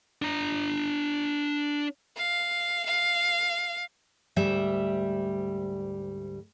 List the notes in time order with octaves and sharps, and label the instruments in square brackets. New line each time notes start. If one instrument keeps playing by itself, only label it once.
[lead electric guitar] D4 A#5
[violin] F5
F5
[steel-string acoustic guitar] D2 G#2 G3 E5